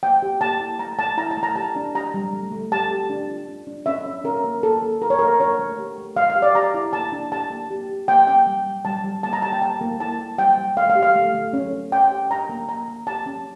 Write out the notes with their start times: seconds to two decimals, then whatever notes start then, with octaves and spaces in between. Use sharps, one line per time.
0.03 A#3 G5
0.22 G4
0.41 A#3 A5
0.60 E4
0.79 A3 A#5
0.99 A3 A5
1.17 E4 A#5
1.31 A5
1.37 A3
1.43 A#5
1.56 G4 A5
1.76 D4
1.95 G4 A#5
2.14 G3
2.33 A3
2.52 A3
2.72 G4 A5
2.90 G4
3.10 D4
3.29 F4
3.48 D4
3.67 D4
3.86 C#4 E5
4.06 C#4
4.24 C#4 A#4
4.44 A#3
4.63 A#3 A4
4.82 A#3
5.01 A#3 A#4
5.10 C#5
5.19 A#3 A#4
5.40 D4 C#5
5.59 A3
5.78 G4
5.98 A3
6.16 A3 F5
6.30 F5
6.36 G4
6.42 D5
6.55 G4 A#5
6.74 E4
6.93 A#3 A5
7.12 D4
7.32 G4 A5
7.50 A#3
7.70 G4
7.89 G4
8.08 A#3 G5
8.27 C#4 G5
8.47 G3
8.66 G3
8.85 G3 A5
9.04 G3
9.23 A#3 A5
9.33 A#5
9.42 G4 A5
9.52 G5
9.62 A#3 A5
9.81 A#3
10.00 E4 A5
10.20 A#3
10.38 G3 G5
10.57 G3
10.77 A3 F5
10.90 F5
10.95 G4
11.03 F5
11.15 A3
11.35 A3
11.53 C#4
11.73 C#4
11.92 C#4 G5
12.11 G4
12.30 D4 A#5
12.49 A#3
12.68 A#3 A#5
12.88 A#3
13.07 G4 A5
13.26 C#4